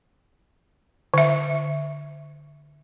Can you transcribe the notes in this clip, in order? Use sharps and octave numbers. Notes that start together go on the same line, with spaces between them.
D3 E5